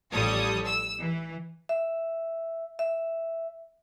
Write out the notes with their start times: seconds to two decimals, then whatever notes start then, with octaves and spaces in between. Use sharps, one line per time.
0.12 A1 F3 G3 A4 C#5 D#6
0.65 E6
0.99 E3
1.69 E5
2.79 E5